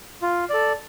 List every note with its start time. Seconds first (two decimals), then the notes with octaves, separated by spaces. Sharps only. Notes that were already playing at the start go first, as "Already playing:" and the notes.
0.22 F4
0.50 A4 D5